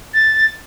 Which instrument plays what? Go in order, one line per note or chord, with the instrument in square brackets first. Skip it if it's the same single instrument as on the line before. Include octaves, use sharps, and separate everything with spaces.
[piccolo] A6